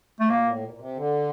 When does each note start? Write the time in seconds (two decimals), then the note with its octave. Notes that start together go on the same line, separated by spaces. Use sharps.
0.20 A2 A3
0.30 A#2 A#3
0.47 A2
0.64 A#2
0.74 A#2
0.80 C3
0.96 D3